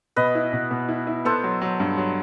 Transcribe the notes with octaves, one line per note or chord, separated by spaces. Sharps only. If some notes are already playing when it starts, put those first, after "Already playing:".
B2 B4 D#5
E4
B2
B2
E4
E4
B3 A4 C5
F#3
F#3
G2
F#3